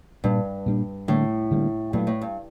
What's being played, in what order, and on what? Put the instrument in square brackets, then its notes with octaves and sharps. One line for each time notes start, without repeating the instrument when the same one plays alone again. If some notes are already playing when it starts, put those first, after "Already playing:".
[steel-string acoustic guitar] G2 [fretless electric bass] A#2 G3 D4
[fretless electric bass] A#2 G3 D4
[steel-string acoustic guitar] A2 [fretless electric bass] D3 G3 A#3 D4
[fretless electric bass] D3 G3 A#3 D4
[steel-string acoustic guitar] G2 [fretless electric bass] A#2 F#3 A3
[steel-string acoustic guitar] A2
G2